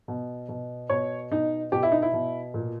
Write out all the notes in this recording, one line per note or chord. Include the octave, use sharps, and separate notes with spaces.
B2
B2
B2 C#5
B2 D#4
B2 G4
E4
D#4
E4
B2
A#2